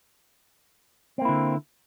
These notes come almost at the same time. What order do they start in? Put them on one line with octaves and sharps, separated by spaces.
C4 A#3 E4 D3